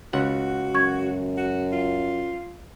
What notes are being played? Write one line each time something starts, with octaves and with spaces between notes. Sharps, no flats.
C#2 F#4 F#5
F#2 C#6 G#6
F#4
F4